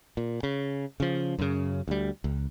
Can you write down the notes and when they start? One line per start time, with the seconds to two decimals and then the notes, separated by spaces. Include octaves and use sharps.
0.17 A#2
0.43 C#3
1.00 C#3 F3
1.38 F#2 C#3
1.88 D2 G3
2.24 C#2